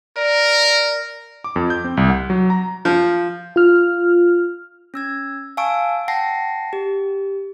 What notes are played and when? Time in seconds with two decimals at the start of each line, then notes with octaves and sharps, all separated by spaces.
0.16 A#4 D5
1.44 D6
1.56 F2
1.70 G6
1.84 C4
1.97 C2
2.10 F#5
2.30 F#3
2.50 A#5
2.85 F3
3.56 F4 F6
4.94 C#4 E6 G#6
5.57 F5 G#5 A5 C#6 E6 D7
6.08 F#5 G5 A5 A#6 C7
6.73 G4